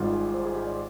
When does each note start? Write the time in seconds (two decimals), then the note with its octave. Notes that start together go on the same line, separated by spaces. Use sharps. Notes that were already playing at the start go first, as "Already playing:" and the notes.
Already playing: G#1 G#2 G3 F4
0.13 G#4
0.34 C5
0.45 G#4
0.55 G4
0.67 D5